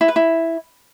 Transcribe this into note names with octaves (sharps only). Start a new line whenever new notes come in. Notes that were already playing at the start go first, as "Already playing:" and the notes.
E4
B4
E4